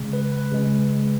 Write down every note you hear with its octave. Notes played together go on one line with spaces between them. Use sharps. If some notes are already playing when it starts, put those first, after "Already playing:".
Already playing: C#3 G#3
B4
B4
C#3 G#3